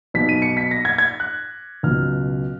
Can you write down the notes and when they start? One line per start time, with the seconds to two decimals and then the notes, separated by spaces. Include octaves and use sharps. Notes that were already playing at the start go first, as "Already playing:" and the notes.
0.14 B1 B2 F#3 B6
0.29 D#7
0.42 C#7
0.57 B6
0.71 A#6
0.85 G#6
0.98 G#6
1.20 F#6
1.83 C#2 B2 F#3 F6